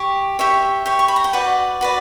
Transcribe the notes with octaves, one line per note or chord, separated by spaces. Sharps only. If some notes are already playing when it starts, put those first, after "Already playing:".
Already playing: G4 C#5 E5
G4 C#5 E5
G4 C#5
C#6
B5
A#5
G5
F#4 B4 D5 F#5
F#4 B4 D5